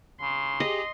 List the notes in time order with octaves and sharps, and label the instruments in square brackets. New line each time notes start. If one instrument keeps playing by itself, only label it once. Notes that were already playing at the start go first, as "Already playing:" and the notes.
[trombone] C#3 [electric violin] C6
[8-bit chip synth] G4 G#4 [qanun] D#5